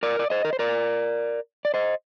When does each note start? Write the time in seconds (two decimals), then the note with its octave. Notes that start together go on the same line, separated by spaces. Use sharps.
0.03 A#4 D5
0.19 D5
0.30 C5 D#5
0.45 A#4
0.53 C5
0.59 A#4 D5
1.65 D5
1.74 C5 D#5